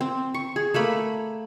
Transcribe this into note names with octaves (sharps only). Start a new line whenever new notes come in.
C4
C#6
G#4
A3 A#3 B5